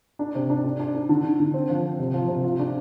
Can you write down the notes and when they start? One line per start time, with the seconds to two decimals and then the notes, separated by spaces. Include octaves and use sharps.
0.19 D4
0.35 C3
0.50 D4
0.64 D4
0.80 D4
0.94 D4
1.09 D3
1.25 D3
1.40 D3
1.54 C4
1.69 F3
1.83 C4
2.00 C3
2.14 F3
2.28 C3
2.44 F4
2.59 D4